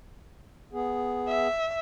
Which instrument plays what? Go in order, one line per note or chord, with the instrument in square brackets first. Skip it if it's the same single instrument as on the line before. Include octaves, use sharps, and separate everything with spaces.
[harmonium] B3 G#4
[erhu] E5